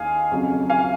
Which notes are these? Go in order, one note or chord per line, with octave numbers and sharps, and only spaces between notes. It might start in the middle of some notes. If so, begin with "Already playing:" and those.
Already playing: D#2 G#4 F5 G#5
F2 C#3 F#3
F5 G#5